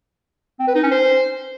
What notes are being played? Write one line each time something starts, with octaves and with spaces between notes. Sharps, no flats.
C4
B4
D#4
C#4
C5